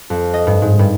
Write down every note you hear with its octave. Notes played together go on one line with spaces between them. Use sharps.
F2
D#5
G2
G#2
G2